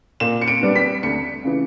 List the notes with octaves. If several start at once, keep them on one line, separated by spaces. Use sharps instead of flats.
A#2 E7
C#7
D7
G3 B3 D4
B6
D2 C#7
C#3 E3